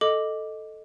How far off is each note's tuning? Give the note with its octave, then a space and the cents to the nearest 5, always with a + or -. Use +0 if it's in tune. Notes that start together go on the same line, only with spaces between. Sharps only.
A4 +0 D#5 +0 D6 +0